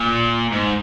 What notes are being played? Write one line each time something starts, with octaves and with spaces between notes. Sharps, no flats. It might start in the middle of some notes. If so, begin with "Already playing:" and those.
Already playing: A#2
G#2